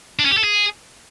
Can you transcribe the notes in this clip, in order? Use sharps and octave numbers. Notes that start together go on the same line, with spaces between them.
D4
C#4
G4
A4
G#4